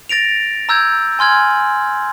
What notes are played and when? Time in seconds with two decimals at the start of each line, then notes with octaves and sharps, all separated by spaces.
0.09 A6 A#6 D7 F7
0.69 A#5 E6 G6 G#6
1.19 G#5 C6 F6 G#6 F#7